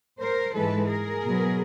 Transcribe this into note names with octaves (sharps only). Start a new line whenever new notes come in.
A#4 C5
G#2 E3 G#3 A4 B4
G#4 A#4
B2 F#3 B3